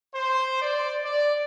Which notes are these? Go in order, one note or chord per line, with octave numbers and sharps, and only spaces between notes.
C5
D5
D5